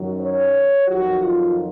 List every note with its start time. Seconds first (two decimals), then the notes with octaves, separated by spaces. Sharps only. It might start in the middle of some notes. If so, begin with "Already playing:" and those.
Already playing: F#2 D#3 F#3
0.19 C#5
0.87 F2 D#3 F#3 F#4
1.21 F4